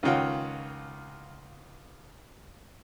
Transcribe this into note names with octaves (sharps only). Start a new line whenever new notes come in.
C#2 D#3 C#4 F4 F#5 G5